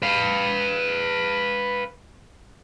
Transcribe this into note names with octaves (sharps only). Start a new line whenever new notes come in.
B4 F5